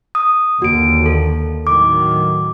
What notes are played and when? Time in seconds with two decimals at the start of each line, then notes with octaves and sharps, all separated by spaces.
0.15 D#6
0.62 D#2 D3 F#4 D7
1.06 A4
1.67 A2 D#3 F#3 D6